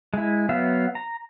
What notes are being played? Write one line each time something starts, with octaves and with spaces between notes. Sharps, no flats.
G#3 E4
F#3 B3 E5 F5
A#5